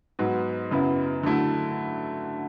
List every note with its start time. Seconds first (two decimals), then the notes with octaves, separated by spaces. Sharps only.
0.19 G#2 F#3 B3
0.71 F#2 C#3 F#3 B3 E4
1.23 D3 F#3 A3 E4